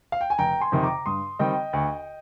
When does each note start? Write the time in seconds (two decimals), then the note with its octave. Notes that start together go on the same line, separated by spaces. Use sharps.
0.12 F5
0.21 G5
0.30 G#5
0.38 F1 G5 A#5
0.60 G#5 C6
0.72 F2 C3 D#3
0.83 A#5 D6
1.06 G2 C6 D#6
1.39 D#3 G3 C4 D#5 G5
1.73 D2